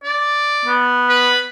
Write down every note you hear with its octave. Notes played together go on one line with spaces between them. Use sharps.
D5
B3
B4